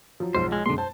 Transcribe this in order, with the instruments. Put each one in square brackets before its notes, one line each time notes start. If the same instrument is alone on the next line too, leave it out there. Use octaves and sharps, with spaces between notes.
[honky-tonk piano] F3 F#3
[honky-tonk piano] B1 G#2 F3 [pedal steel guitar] C5
[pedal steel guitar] G#3
[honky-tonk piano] F#2 B2 G#3 [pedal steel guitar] D3 C6
[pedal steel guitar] C5 [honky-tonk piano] A5